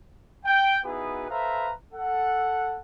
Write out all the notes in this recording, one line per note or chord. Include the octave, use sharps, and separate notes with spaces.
G5
B3 D#4 E4 F#4 G#4 B4
A4 B4 C5 E5 F5 A#5
A4 F#5